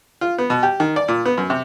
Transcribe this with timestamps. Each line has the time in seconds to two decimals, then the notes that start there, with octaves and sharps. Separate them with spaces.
0.21 F4
0.38 B3
0.50 B2
0.63 G4
0.80 D#3
0.96 D5
1.08 A#2
1.26 B3
1.37 F#2
1.50 C3